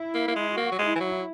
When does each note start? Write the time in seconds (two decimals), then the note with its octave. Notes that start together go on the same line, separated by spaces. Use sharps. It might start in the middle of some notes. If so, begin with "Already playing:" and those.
Already playing: E4
0.14 A#3
0.28 A#3
0.36 G#3
0.57 A#3 F#4
0.72 F#3
0.79 G#3
0.86 E4
0.96 E3
1.00 F#3